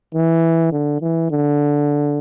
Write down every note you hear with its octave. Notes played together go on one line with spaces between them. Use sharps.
E3
D3
E3
D3